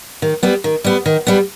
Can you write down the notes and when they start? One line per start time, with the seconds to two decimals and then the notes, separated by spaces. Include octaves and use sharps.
0.22 D#3
0.43 G3 B3
0.64 D#3
0.84 G3 B3
1.06 D#3
1.27 G3 B3